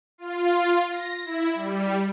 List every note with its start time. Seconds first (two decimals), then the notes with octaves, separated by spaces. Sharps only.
0.18 F4
0.89 A#6
1.25 E4
1.54 G3